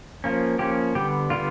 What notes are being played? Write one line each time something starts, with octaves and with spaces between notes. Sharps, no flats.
F3 A#3 C#4
F3 A#3 C#4 G4
D3 G3 B3 G4
D3 G3 B3 F4